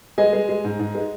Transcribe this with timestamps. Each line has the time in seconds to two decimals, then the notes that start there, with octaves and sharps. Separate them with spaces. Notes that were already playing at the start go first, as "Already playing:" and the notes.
0.18 G#3 D#5 G#5
0.33 G#3
0.49 G#3
0.64 G#2
0.79 G#2
0.95 G#3